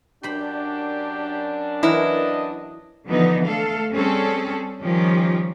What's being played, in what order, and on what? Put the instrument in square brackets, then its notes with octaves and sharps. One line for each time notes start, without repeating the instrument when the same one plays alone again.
[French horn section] F#2 D4 [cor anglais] G4 [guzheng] C5 B5 C6
[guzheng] E3 F#3 A#4 [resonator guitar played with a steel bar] E4 [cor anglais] D#5
[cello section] D3 E3 F3 B3 D#4
A3 A4 F5
G3 C4 C#4 G#4 A4
D#3 F3 G3 C#4 G4